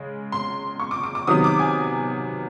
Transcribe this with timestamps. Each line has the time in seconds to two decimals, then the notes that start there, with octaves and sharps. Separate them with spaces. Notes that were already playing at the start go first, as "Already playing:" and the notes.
Already playing: C#3 G#3
0.32 C6
0.80 C#6
0.91 D6
1.04 D6
1.15 D6
1.27 C3 D#3 F#3 B3 D#6
1.44 D6
1.59 G#5